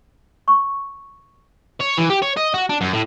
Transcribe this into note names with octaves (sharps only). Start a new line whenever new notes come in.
C#6
C#5
E3
G4
C#5
D#5
F#4
D4
F#2
A2